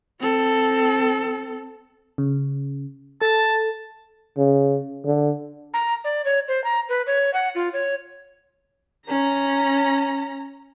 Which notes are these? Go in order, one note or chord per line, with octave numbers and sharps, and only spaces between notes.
C4 A4
C#3
A4 A5 A6
C#3
D3
A#5
D5
C#5
C5
A#5
B4
C#5
F#5
F4
C#5
C#4 A#5